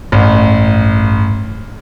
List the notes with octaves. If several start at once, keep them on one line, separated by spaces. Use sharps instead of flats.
A1 G2